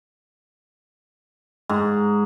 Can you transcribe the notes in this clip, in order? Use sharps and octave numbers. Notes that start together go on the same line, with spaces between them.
G#2